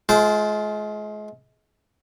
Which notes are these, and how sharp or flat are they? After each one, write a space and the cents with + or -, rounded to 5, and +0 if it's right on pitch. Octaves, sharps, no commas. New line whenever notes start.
G#3 +35 F4 +0 C5 -15